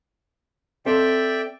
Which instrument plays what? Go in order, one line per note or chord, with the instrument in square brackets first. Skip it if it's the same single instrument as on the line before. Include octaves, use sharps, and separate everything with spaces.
[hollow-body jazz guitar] C4 A4 C5 [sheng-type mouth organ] D5 E5 G5